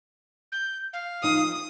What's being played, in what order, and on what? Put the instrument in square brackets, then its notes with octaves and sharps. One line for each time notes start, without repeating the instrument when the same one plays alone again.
[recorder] G6
F5
[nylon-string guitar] F3 D#4 [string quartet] D#6